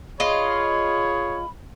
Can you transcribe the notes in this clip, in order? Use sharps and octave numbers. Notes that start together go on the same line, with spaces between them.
F4 G#4 C#5 D#5 B5